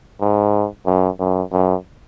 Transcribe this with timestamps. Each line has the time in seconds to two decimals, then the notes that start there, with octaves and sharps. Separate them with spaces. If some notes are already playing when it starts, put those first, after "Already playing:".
0.21 G#2
0.86 F#2
1.19 F#2
1.52 F#2